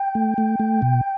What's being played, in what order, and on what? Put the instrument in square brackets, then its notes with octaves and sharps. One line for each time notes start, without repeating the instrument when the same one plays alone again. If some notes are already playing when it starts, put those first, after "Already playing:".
Already playing: [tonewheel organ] G5
A3
A3
A3
B2